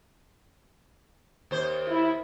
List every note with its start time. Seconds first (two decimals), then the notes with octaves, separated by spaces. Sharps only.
1.51 D#2 C5
1.90 E4